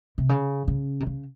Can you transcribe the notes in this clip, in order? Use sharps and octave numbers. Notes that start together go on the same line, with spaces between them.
C3
C#3
C#3
C3
C#3